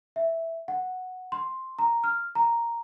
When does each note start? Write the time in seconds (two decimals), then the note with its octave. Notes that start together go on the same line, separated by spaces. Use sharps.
0.16 E5
0.68 F#5
1.32 C6
1.79 A#5
2.04 F6
2.35 A#5